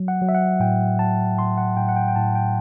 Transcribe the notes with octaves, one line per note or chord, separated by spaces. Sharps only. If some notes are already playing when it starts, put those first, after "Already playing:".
Already playing: F#3
F#5
F#3
E5
F#5
A2 G5
F#3 A5
A2 C6
F#5
A2 G5
F#5
G5
G5
A2 A5
G5